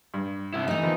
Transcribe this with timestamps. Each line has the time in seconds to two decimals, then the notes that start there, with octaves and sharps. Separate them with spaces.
0.14 G2
0.54 C3 E4
0.68 E3 A3 D#4
0.83 D#3 F3 B3